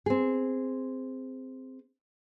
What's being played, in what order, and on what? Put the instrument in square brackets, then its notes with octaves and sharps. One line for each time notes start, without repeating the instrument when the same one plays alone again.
[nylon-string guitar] C4 G#4